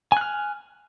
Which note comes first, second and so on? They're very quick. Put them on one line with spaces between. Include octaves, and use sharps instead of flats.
G#5 F#6 F6